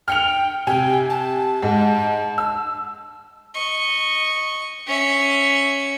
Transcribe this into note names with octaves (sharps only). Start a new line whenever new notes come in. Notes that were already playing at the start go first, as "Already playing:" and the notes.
G5 F6 C#7 F7
C3 G5 G#5
A5
G#2
E6
D#5 C#6
C#4 E5